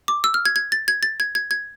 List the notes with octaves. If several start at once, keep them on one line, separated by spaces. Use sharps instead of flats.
D6
E6
F6
G#6
G#6
A6
G#6
A6
G#6
G#6
G#6